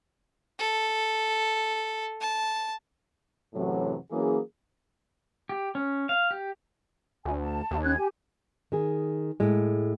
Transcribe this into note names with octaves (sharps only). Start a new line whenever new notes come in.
A4
A5
F#2 A2 C3 E3 F#3
E3 F#3 A#3 C#4 G#4
G4
C#4
F5
G4
D2 G#5
A5
D#2
C#4 F#6 G#6
G4 G#5
D#3 G#4
A2 G#3